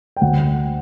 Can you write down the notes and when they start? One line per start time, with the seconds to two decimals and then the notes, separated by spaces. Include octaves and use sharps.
0.17 G5
0.21 D2 F#5